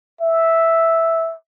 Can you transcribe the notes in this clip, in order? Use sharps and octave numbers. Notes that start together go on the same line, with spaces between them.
E5